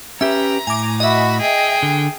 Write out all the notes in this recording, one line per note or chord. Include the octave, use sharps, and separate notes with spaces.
C#4 G4 B4 E5 A#5
A2 G#5 D6
F#4 D#5 E5 B5
G#4 G5
D3